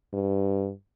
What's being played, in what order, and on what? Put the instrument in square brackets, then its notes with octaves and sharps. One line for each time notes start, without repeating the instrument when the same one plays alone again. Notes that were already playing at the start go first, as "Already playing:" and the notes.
[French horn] G2